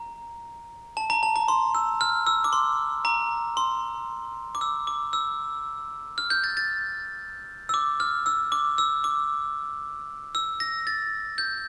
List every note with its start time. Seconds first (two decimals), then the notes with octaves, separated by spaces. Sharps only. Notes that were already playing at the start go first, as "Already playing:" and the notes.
Already playing: A#5
0.97 A5
1.10 A#5
1.23 A5
1.36 A#5
1.48 C6
1.75 E6
2.01 F6
2.27 E6
2.44 D6
2.53 C6
3.05 A#5
3.57 C6
4.55 D6
4.61 E6
4.87 D6
5.13 E6
6.18 F6
6.30 G6
6.44 A6
6.57 A6
7.69 E6
7.74 D6
8.00 F6
8.26 E6
8.52 D6
8.78 E6
9.04 D6
10.35 E6
10.60 A#6
10.87 A6
11.38 G6